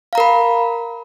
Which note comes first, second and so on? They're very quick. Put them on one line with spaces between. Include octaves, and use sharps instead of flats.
F5 A#5 A#4 B5